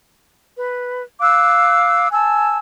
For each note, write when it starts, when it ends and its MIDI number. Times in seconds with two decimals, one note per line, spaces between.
0.56 1.02 71
1.20 2.07 77
1.20 2.07 86
1.20 2.07 88
1.20 2.07 90
2.12 2.57 80
2.12 2.57 81
2.12 2.57 88